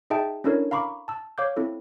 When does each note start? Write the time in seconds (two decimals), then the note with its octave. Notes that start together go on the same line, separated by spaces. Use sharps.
0.10 D#4 G#4 D#5 E5 G5 A5
0.44 C#4 D4 E4 A4 A#4 C#5
0.71 F5 A#5 B5 C#6 D6
1.08 A5 E6
1.38 C#5 F5 D6 G6
1.57 C4 E4 A4